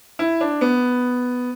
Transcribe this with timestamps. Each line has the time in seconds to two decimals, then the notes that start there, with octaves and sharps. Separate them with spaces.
0.19 E4
0.41 D4
0.61 B3